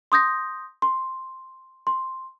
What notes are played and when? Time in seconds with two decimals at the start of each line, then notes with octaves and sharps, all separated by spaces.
0.12 C6 D#6 G6 A#6
0.82 C6
1.87 C6